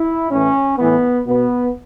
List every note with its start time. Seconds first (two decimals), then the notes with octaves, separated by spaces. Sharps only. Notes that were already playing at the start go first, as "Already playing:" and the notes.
Already playing: E4
0.31 A2 E3 C#4
0.78 A2 E3 B3
1.27 B2 B3